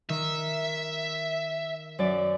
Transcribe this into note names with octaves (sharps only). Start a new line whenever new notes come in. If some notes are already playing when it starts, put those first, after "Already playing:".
D#3 E5
F#2 D5